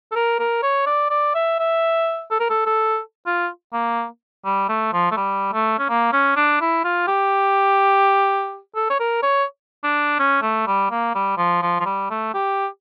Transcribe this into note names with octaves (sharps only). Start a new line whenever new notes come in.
A4
A#4
A#4
C#5
D5
D5
E5
E5
A4
A#4
A4
A4
F4
A#3
G3
A3
F3
A3
G3
A3
C#4
A#3
C#4
D4
E4
F4
G4
A4
C#5
A#4
C#5
D4
C#4
A3
G3
A#3
G3
F3
F3
F3
G3
A3
G4